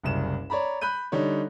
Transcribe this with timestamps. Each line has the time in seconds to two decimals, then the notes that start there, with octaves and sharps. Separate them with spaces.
0.03 F#1 C2 E7
0.50 C#5 D5 A#5 B5
0.81 B5 F#6 G6 D#7
1.12 D3 G3 D#4 C#5